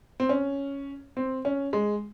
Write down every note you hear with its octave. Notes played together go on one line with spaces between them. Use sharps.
C4
C#4
C4
C#4
G#3